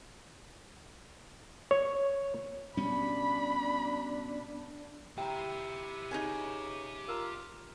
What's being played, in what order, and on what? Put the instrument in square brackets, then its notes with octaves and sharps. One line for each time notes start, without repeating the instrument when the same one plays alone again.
[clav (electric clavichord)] C#5
[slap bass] B2 G3 C#4 [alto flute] D4 [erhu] B5
[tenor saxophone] E4 [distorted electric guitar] G4 E5 [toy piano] G5 A#5
[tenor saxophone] C#3 [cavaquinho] D#4 E4 G#5
[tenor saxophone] F4 [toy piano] A#4 A#5